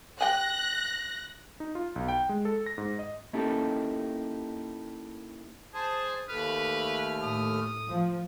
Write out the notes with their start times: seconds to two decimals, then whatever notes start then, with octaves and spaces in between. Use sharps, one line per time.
0.21 G3 G5 G#5 F#6 A#6
1.60 D#4
1.75 F4
1.96 B1
2.08 G5
2.29 G#3
2.45 A4
2.66 A#6
2.78 G#2
2.99 D#5
3.33 A#3 C#4 D#4 E4 G4 A4
5.74 G#4 C5 A5
6.29 D#2 A3 B4 F6
7.22 A2 D#6
7.88 F3